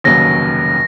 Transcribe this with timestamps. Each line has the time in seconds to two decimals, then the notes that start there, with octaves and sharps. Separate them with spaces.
0.04 F1 D#2 C#3 F#3 A#6